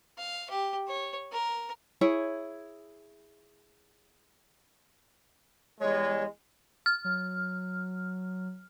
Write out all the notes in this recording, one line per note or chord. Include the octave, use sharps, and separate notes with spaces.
F5
G4
C#5
A#4
E4 G#4 C#5
E2 G3 G#3 C#5
F6
F#3